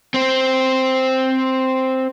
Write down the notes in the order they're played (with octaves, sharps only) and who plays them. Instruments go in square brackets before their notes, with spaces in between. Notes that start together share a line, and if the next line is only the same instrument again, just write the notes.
[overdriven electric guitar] C4 C5